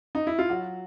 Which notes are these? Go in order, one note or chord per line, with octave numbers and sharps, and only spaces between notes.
D#4
E4
F4
F#3 F#4